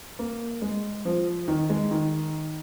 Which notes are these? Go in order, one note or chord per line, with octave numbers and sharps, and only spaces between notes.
A#3
G#3
F3
D#3
G#3
D#3